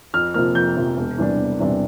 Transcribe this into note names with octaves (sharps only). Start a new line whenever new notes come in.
F2 F6
C3 F3 A#3 F6
F2 G6
C3 F3 A#3
E1
E2 C3 G3 D4
E1
E2 C3 G3 D4